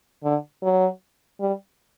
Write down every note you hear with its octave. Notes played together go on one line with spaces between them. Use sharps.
D3
F#3
G3